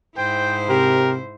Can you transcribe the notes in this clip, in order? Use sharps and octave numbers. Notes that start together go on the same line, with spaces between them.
G#2 E4 C5 G5
C3 G4 A#4